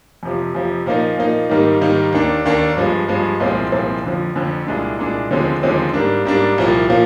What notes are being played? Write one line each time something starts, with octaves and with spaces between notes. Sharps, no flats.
F2 C3 F3
F2 C3 F3
A#2 F3 A#3 D#4
A#2 F3 A#3 D#4
G#2 D#3 G3 A#3 D#4
G#2 D#3 G3 A#3 D#4
D#2 D#3 A#3 D4
D#2 D#3 A#3 D4
G2 F3 G#3
G2 F3 G#3
C2 A#2 F3 G#3 C4
C2 A#2 F3 G#3 C4
F2 D3 F3
F2 D3 F3
C2 A#2 G#3 D4
C2 A#2 G#3 D4
D#2 D3 F3 G#3 C4
D#2 D3 F3 G#3 C4
G#2 G3 A#3 D4
G#2 G3 A#3 D4
C2 A#2 F3 A#3
A#2 F3 A#3